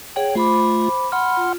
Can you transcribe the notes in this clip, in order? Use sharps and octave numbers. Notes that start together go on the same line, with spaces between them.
G#4 C#5 F#5 G5
A3 F4 C5 B5 D6
F#5 B5 C6 F6
F4